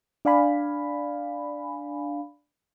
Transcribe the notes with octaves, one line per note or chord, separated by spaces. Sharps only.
D4 D5 F5 G#5 B5